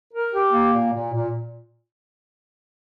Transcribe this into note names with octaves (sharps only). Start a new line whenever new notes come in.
A#4
G4
A#3
A#2
A#2
A#2